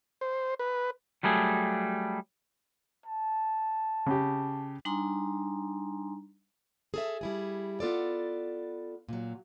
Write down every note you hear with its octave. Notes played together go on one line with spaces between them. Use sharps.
C5
B4
F#3 G3 A3 G#4
A5
C#3 G4
G3 D4 D#4 G#5 A#5 C6
G#4 A4 E5
G3 E4 G#4
B3 F4 A4 D5
A#2 F#3